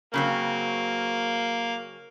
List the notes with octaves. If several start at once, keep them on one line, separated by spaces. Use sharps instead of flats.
C#3 F#3 A#3 C4